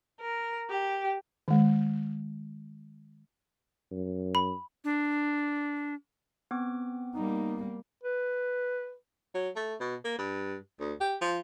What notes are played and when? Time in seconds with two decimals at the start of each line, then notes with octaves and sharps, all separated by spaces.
0.21 A#4
0.70 G4
1.48 D#3 G#3
3.91 F#2
4.35 B5
4.84 D4
6.51 B3 C4 D6
7.15 G3 A#3 D#4
8.03 B4
9.34 F#3
9.56 A3
9.80 B2
10.05 A#3
10.19 G2
10.80 D2
11.01 G4
11.21 F3